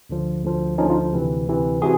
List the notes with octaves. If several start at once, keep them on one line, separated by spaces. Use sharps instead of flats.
D2 D3 F3
D2 D3 F3
D2 D3 F3 C#4 D#4
D#4 F4
D2 C3 E3
D2 C3 E3
C3 E3 F#4 G#4